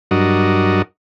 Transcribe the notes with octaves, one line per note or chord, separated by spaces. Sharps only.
G2 F#3 D4 F#4 A#4 D#5